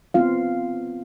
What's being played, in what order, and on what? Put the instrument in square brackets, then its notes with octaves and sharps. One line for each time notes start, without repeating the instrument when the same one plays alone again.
[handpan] B3 C4 F4 F5